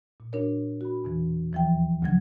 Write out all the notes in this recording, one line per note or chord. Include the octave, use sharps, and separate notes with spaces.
A#2
D4 F#4 A#4 C#5
F#4 B5
E2 B2 E3
D#2 E3 F3 E5 G5
D2 C#3 F3 F#3 G#6